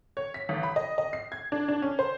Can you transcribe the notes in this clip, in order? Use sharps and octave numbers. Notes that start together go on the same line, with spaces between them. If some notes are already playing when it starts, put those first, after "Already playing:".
C#5
B6
A1
B5
D#5
D#5
C7
G#6
D4
D4
C#4
C5